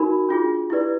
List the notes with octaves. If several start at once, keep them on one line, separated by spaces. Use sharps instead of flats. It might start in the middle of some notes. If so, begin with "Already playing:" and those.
Already playing: D#4 F#4 A#4 B5
D4 F4 G#4
E4 G4 B4 D5